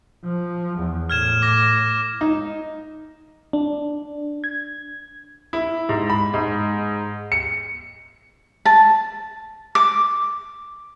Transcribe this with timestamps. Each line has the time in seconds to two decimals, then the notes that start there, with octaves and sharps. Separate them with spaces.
0.24 F3
0.79 E2
1.10 A2 F6 G#6 E7
1.42 D6 A#6
2.21 D#4
3.53 D4
4.44 G#6
5.53 E4
5.89 G#2
6.10 B5
6.34 G#2
7.32 C#7
8.65 A5
9.75 D6